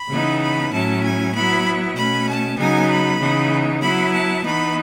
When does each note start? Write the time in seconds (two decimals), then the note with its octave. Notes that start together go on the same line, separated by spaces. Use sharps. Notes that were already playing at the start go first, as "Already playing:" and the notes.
Already playing: B5
0.09 C#3 E3 B3 D#4
0.41 B5
0.72 A2 F#3 C#4 E4 A5
1.03 G#5
1.34 F#3 B3 E4 B5
1.95 B2 A3 C#4 B5
2.27 A5
2.57 C#3 F#3 B3 D#4 G#5
2.89 B5
3.20 C#3 E3 B3 D#4
3.81 F#3 B3 E4 B5
4.12 A5
4.44 E3 B3 D#4 B5